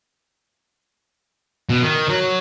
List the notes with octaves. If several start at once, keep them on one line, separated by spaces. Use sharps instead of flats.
B2
D#3
F#3